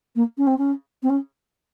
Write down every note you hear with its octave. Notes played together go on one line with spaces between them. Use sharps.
A#3
C#4
C4
C#4
C4
C#4